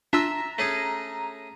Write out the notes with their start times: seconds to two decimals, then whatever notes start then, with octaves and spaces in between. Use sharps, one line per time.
0.13 D4 F4 E5 A#5 E6
0.58 A3 C#4 G#4